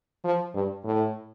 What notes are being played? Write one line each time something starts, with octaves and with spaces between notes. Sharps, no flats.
F3
G2
A2